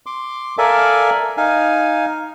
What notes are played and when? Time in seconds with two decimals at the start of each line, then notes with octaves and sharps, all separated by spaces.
0.06 C6 D6
0.58 A4 A#4 D5 E5 F5 G#5
1.37 D#4 F5 G#5